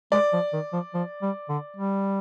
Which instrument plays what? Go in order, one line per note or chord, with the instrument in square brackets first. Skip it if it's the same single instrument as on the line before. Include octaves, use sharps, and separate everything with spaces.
[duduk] G#3 [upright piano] D5
[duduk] F3
D#3
F3
F3
G3
D3
G3